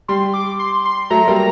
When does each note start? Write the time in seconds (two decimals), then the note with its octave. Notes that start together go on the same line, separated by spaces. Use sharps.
0.08 G3 C6
0.34 D6
0.59 C6
0.85 C6
1.10 F#3 A3 A#5
1.28 G3 A#3
1.36 A#5